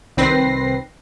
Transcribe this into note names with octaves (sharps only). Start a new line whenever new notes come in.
C2 D#3 C4 B4 A#6 C7